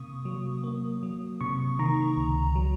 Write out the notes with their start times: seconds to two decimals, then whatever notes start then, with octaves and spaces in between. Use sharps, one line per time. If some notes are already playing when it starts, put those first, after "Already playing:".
Already playing: C3 A#3 C#6 D#6
0.25 F#3
0.64 A#3
1.03 F#3
1.41 C3 C#6
1.79 D#3 A#5
2.17 C#2
2.56 F#3